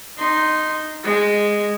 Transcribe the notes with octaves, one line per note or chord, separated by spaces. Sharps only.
D#4 C6
G#3